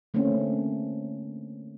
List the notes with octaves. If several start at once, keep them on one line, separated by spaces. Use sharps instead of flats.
D3 A3 A#3 C4 C#4